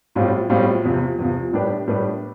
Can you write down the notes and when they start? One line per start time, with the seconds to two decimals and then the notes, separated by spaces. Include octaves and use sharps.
0.15 B1 A2 G3 C4 F4
0.50 B1 A2 G3 C4 F4
0.84 E2 C3 F3
1.19 E2 C3 F3
1.53 A2 G3 D4 G4 B4
1.87 A2 G3 D4 G4 B4